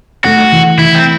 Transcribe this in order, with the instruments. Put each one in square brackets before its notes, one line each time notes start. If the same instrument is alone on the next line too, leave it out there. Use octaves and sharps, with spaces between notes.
[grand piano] A3 [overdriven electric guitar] F#4
[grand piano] E3
[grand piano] E3 [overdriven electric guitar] E4
[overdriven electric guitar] C4